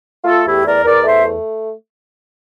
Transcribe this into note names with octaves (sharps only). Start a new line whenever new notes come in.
A3 F4 A4
E2 E4 G4
E2 A#4 D5
E2 A#4 D5
A3 C5 E5
A3